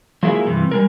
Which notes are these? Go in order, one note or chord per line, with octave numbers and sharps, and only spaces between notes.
F3 F#3 G#3 A#3 E4 G#4
G2 C3 E3
G3 G#3 A#4